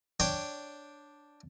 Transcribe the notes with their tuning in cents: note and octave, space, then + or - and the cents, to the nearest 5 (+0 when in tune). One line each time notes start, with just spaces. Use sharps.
D4 +0 C#5 +0 G5 +0